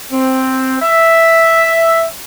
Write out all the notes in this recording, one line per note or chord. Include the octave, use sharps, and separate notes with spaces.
C4
E5